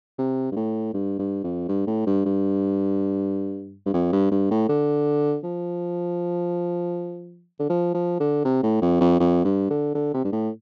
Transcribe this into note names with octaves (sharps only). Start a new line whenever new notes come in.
C3
G2
A2
G2
G2
F2
G2
A2
G2
G2
G2
F2
G2
G2
A2
D3
F3
D3
F3
F3
D3
C3
A2
F2
F2
F2
G2
D3
D3
C3
G2
A2